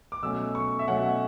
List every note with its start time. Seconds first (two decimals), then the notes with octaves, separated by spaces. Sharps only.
0.12 D6
0.22 B2 F#3 A3 C#4 E6
0.55 C#6
0.79 E5
0.88 B2 F#3 A3 C#4 F#5